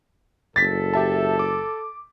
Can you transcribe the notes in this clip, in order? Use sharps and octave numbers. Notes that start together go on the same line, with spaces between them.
F#1 A4 A6 B6
G4 E5 A5
D6